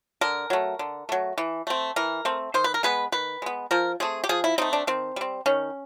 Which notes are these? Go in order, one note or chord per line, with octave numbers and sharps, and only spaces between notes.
D3 A#4
F#3 A3
D3
F#3 A3
E3
A3 C4
E3 A#4
A3 C4
D#3 C5
B4
A#4
G#3 B3 B4
D#3 B4
G#3 B3
F3 A#4
A3 C4 G#4
G4
F3 G#4
E4
A3 C4 D#4
D4
D#3 C4
G3 C4
D#3 C#4